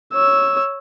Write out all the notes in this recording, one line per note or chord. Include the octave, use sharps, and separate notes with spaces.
C#5 E6